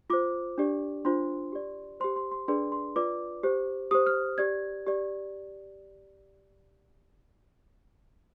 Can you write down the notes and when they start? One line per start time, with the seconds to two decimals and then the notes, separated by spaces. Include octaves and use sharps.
0.10 F4 C5 D6
0.58 D4 G4 D5
1.05 D4 F4 C5 C6
1.52 G4 D5
2.00 G4 C5 C6
2.16 C6
2.32 C6
2.48 D4 G#4 B4 D5 C6
2.72 C6
2.96 F4 B4 D5 D6
3.43 G4 C5
3.91 G4 C5 D#6
4.06 F6
4.38 G4 D5 G#6
4.86 G4 D5